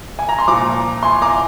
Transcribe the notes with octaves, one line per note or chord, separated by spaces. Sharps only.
G#5
A#5
C6
A#2 F3 A#5 D6
G#5 C6
A#5 D6